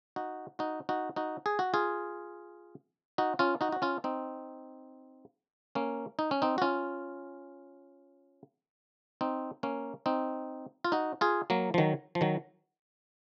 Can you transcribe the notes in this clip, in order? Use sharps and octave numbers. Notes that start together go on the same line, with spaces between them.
D#4 F#4
D#4 F#4
D#4 F#4
D#4 F#4
G#4
F#4
F4 G#4
D#4 F#4
C#4 F4
D#4 F#4
F#4
C#4 F4
C4 D#4
A#3 C#4
D#4
C#4
C4 D#4
F#4
C#4 F4
C4 D#4
A#3 C#4
C4 D#4
F4
D#4 F#4
F4 G#4
F#3 A#3
F3
D#3 F#3
F3
D#3 F#3